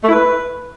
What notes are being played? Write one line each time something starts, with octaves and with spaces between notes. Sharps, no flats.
A3
E4
B4